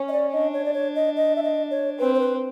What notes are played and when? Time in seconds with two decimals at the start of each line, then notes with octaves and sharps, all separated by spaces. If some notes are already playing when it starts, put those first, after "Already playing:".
Already playing: C#4
0.09 D#5
0.12 D5
0.33 D4 D#5
0.54 C#5
0.65 D5
0.74 C#5
0.95 D#5
1.16 D#5
1.36 E5
1.43 D#5
1.71 C#5
1.99 C4 B4
2.15 C5
2.19 B4